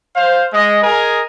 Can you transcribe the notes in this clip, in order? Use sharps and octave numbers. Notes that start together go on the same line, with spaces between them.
C5 F5
G#3 D#5
G#4 A#4 D#5 G#5